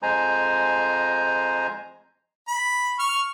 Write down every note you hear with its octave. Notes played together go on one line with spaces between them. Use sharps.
F2 G#3 C5 G#5 A#5
B5
C#6 F6